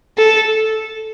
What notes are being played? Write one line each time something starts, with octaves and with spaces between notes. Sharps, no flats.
A4